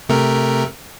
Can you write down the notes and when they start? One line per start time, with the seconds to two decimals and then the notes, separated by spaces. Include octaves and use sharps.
0.09 C3 A3 A#4